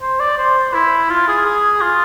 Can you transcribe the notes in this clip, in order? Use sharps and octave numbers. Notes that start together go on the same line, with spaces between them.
C5
D5
C5
E4
F4
G#4
G#4
F4